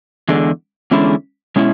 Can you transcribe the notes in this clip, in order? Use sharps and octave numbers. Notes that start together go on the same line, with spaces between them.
E2 D3 G#3
E2 D3 G#3 C#4 E4
B2 G#3 C#4 E4